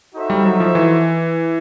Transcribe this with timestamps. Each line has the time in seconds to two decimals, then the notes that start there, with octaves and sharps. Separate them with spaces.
0.15 D#4 F#4 A4 C5 E5
0.30 G3
0.45 F#3
0.60 F3
0.75 E3